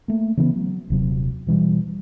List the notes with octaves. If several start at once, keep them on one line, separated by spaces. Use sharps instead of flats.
A3 A#3
C#3 E3 G#3 B3
F#3
D#1 C3 F#3
B2 E3 F3 G3